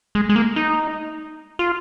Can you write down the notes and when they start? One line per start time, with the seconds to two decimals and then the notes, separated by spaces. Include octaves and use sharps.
0.15 G#3
0.29 G#3
0.36 A#3
0.56 D#4
1.59 F4